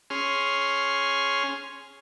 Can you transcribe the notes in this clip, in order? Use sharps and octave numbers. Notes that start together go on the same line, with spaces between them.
C#4 G#4 C6 F6